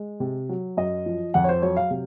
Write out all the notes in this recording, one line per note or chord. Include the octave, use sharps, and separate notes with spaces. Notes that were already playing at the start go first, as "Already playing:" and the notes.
Already playing: G#3
C3
F#3
F#2 D#5
F3
F2 F#5
C#5
C5
F#3 C#5
F5
C3